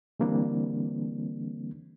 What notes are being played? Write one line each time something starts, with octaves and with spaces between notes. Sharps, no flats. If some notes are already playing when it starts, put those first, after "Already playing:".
D3 E3 G3 A#3 C4 D4